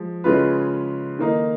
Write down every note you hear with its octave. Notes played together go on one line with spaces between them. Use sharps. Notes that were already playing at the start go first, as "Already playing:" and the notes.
Already playing: F3 G#3
C#3 G#3 C#4 F4 B4
D#3 A#3 D#4